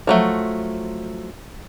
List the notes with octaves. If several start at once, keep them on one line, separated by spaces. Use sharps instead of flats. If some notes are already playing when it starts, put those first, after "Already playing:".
F3 F#3 A3